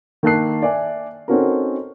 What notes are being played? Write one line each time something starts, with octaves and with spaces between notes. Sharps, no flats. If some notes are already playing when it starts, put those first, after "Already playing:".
D#3 A#3 A5 F#6 C7
D5 E5 G#5
C4 C#4 D#4 F#4 A4 A#4